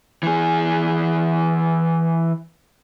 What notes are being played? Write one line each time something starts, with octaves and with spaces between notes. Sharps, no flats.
E3 G#4